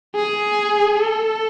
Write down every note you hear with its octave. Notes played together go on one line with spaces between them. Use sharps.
G#4
A4